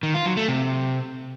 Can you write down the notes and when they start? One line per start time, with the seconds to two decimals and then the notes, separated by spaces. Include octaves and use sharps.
0.03 D#3
0.14 F4
0.26 F#3
0.37 A3
0.48 C3